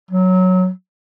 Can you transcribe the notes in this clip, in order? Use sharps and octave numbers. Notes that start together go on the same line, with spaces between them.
F#3